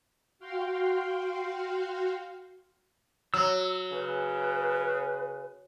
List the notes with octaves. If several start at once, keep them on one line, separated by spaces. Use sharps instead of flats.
F#4 F5 G5 C6
F#3 E6
C#3 B4